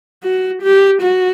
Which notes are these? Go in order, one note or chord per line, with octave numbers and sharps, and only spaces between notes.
F#4
G4
F#4